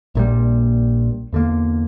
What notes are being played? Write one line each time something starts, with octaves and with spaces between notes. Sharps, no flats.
A#1 A#2 G3
E2 D3 A#3